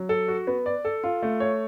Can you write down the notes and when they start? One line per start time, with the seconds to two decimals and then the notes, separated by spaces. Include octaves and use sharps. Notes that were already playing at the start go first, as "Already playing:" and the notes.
Already playing: F#3
0.09 A4
0.28 F#4
0.47 B3
0.66 D5
0.85 A4
1.04 F4
1.22 A3
1.40 C#5